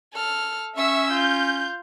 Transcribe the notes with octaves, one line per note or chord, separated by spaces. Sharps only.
A4 F6
C#4 E5 C#6 E6
F4 G6